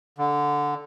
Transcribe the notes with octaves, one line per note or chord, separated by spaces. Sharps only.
D3